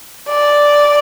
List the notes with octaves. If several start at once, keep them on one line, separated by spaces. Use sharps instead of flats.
D5